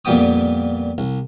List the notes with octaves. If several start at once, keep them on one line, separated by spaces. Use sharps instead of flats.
F2 A#2 G3 B3 G5 D#6
C2